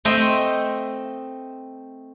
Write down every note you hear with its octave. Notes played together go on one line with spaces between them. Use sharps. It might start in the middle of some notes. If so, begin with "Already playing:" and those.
A3 C4 D#5 E5 G5 C6